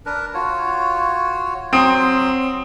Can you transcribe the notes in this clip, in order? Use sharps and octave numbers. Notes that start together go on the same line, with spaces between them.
D4 A#4 B4
F4 F#4 C#5
F#3 C4 C6 D#6